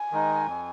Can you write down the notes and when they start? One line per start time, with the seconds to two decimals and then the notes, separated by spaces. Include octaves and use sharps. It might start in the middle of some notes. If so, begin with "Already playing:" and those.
Already playing: G#5
0.12 D#3 G#3 D#4
0.47 F2